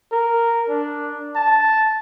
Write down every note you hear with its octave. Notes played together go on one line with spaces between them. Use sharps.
A#4
D4
A5